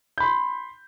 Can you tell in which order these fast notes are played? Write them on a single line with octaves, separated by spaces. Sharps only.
G6 B5 C6